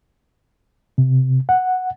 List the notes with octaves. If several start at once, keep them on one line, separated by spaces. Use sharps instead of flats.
C3
F#5